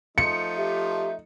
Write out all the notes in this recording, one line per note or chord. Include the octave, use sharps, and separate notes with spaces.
F3 A3 D#4 C#7
G4 E5